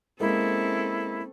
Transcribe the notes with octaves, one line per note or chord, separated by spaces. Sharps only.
G#3 A#3 C4 C#4 E4 A4